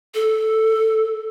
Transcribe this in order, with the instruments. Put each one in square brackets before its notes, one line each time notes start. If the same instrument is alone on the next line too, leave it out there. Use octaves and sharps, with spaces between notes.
[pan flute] A4